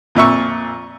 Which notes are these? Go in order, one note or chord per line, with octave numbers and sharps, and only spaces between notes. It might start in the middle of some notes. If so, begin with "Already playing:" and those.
F2 A#2 E5 C#6